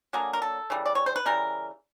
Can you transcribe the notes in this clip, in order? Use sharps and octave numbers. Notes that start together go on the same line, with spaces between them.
D3 F#3 A#3 G#4
A#4
A4
C#3 E3 G3
D5
C#5
C5
B4
C#3 E3 G3 A#4